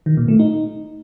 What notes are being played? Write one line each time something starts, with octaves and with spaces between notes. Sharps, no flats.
D#3
A#2
A3
D#4